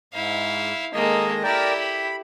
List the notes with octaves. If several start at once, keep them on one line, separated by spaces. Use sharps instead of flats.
G#2 E4 F5
D#3 G#3 A#3 A4 D#5
E4 G4 A#4 D5 G5
B5